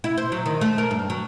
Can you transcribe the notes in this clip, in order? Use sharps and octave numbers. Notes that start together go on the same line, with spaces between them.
E4
C5
F#3
D#3
A3
A#4
G2
F#3